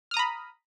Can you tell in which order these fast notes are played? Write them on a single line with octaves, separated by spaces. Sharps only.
F6 D#6 A#5 B5